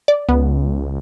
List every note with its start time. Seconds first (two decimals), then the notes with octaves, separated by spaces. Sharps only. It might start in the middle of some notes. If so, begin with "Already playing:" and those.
0.08 D5
0.29 C#2 B3